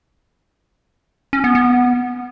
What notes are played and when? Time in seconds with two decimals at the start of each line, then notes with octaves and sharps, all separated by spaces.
1.33 C#4
1.44 B3
1.55 B3